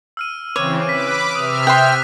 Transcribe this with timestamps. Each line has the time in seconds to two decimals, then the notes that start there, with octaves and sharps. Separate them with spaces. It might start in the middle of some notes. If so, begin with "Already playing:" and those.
0.17 E6 F6 D#7
0.56 C#3 E3 C4 C#5 D6 D#7
0.89 B4 D6 B6
1.36 C3 E5 D#6 F6
1.67 G5 C6 F#6 B6